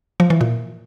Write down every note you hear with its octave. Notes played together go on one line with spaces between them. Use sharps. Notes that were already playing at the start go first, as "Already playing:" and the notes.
F3
E3
A#2